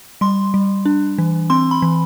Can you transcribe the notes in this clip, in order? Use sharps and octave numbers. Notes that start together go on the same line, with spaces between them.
G3 C6
G3
D4
E3
C4 C6
B5
E3